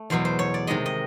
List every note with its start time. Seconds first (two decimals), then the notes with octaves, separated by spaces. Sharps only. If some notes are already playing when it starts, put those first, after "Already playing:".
Already playing: A3
0.10 E2 B2 F#3 C5
0.25 C5
0.39 C#5
0.54 D5
0.67 C3 D#3 G#3 D#5
0.86 D#5